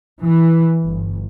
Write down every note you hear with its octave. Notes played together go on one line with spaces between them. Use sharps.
E3
G1